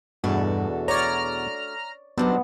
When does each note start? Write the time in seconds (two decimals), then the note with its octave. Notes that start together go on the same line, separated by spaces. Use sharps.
0.24 E2 G2 B2 A3 D4 F#4
0.88 C#5 D5 A#5 F6
2.18 D#2 F#3 G3 B3 C4 D4 C5